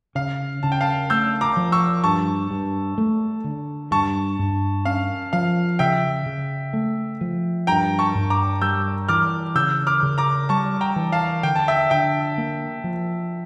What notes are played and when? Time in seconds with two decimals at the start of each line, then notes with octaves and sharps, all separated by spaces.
0.15 C#3 F5
0.63 C#3 A5
0.72 G5
0.81 F5 A5
1.10 A3 E6 G6
1.41 A#5 D6
1.57 F3
1.72 C#6 E6
2.04 G2 A5 C#6
2.51 G2
2.98 A3
3.44 D3
3.91 G2 A5 C#6
4.39 G2
4.85 C#4 F5
5.33 F3 F5
5.79 C#3 E5 G5
6.26 C#3
6.73 A3
7.21 F3
7.67 G2 G5 A#5
7.99 A5 C#6
8.15 G2
8.30 A#5 D6
8.62 G3 E6 G6
9.09 E3 D6 F6
9.55 C#3 E6 G6
9.87 D6 F6
10.03 C#3
10.18 A#5 D6
10.49 G3 A5 C#6
10.81 G5 A#5
10.96 E3
11.12 F5 A5
11.43 D3 G5
11.55 A5
11.68 E5 G5
11.90 D3 E5 G5
12.38 A#3
12.84 F3